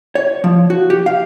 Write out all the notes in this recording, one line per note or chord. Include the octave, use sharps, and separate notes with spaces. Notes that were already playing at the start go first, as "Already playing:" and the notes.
C#5
F3
F#4
G4
F5